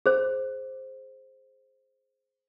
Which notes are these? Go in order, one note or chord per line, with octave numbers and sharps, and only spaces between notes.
G#4 C5